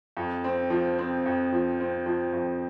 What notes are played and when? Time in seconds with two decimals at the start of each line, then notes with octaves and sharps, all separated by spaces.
0.17 F2
0.44 C4
0.70 F3
0.99 C4
1.26 F2
1.52 F3
1.80 C4
2.06 F3
2.33 F2